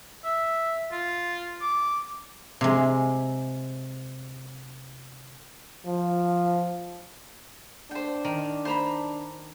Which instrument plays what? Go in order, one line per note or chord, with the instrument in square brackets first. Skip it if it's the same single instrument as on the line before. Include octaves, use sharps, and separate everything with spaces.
[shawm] E5
F4
D6
[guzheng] C3 G#3
[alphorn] F3
[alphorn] D4 [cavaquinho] C5 G5
[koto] D#3
[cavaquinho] C5 A#5 B5